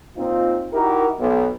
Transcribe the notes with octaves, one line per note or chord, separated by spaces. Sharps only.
A#2 C4 D#4 F4
D#4 E4 F#4 G4 A#4
B1